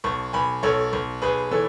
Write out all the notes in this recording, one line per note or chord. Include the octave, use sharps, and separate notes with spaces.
B1 A5 C#6
B1 G#5 B5
B1 A4 C#5
B1
B1 G#4 B4
E3 A4 C#5